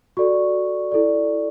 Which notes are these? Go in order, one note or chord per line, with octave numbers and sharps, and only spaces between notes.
F#4 A4 D5 C#6
E4 A4 D5